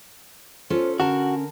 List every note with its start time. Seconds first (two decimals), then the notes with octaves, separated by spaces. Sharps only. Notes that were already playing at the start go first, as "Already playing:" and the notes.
0.70 C#4 F4 A4 C5
1.00 D3 C#4 F#4 A#4 A5